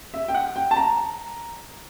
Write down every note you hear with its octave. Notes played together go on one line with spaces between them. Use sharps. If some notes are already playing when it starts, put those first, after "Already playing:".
E5
G5
F#5
G5
A5
A#5